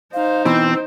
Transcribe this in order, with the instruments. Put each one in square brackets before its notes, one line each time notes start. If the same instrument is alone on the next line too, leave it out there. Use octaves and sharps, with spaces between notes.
[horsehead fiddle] D#4 C5 [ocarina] F5
[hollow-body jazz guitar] B2 E3 [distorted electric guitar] C4 [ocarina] E6